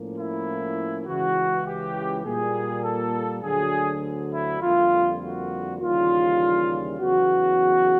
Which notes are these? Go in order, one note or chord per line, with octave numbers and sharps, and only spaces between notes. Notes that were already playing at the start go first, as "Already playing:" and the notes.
Already playing: A2 F3 A#3 C#4
E4
C#2 C#3 E3 F#4
G4
A#2 G3 A#3 G#4
A4
D2 D3 F#3 G#4
E4
F2 D3 G3 A#3 F4
F#4
D#2 C#3 E3 G3 F4
E2 C#3 F#3 B3 F#4